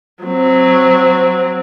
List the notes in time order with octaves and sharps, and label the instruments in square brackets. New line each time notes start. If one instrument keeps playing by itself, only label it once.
[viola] F#3 C4